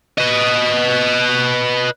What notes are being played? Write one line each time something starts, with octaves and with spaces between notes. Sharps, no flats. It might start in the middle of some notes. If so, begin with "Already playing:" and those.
B4 D#5